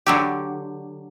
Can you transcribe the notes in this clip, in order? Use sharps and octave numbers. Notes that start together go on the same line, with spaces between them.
D3 F#3 G4